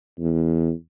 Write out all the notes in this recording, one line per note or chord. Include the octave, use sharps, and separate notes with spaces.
E2